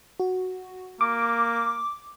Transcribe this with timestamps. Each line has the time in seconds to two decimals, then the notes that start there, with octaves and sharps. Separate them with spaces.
0.20 F#4
1.01 A#3 D6